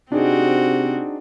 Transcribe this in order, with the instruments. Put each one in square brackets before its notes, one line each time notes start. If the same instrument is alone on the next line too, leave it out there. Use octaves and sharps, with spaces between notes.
[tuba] C3 [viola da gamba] C4 F#4 [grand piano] D4 D#4 G#4